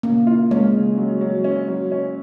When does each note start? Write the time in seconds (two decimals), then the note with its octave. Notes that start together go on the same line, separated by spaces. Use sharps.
0.03 C#3 A#3
0.27 F4
0.51 G#3 C#4
0.74 C#3
0.98 F#3
1.21 F#3
1.44 C#4
1.68 F#3
1.92 C#4